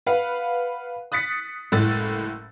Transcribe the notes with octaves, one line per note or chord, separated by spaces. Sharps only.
B4 F5 F#5
D#6 F#6 A6 B6 C#7
F#1 A2 G#3 E6 A6